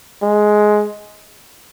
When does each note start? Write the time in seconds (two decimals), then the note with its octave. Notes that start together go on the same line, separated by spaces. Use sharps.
0.22 G#3